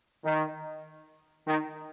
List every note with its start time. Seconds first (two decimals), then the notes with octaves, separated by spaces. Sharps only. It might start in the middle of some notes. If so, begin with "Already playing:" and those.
0.24 D#3
1.47 D#3